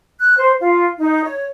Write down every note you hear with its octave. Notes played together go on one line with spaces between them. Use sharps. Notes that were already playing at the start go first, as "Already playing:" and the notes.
F#6
C5
F4
D#4
C#5